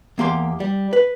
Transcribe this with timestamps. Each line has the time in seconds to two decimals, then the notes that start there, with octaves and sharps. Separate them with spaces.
0.18 E2 A#3 G4 C6
0.60 G3
0.93 B4